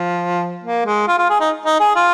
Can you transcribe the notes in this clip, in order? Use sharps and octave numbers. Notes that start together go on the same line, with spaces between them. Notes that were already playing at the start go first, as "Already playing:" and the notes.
Already playing: F3
A#3
G#3
F4
F4
G#4
D#4
D#4
G#4
F4